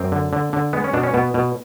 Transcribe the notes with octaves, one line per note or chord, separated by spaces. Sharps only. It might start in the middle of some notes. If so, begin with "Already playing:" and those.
Already playing: F#2 C4
D3
D3
D3
G#3 B3
C#4
B2 D4
C#4
B2 B3
B2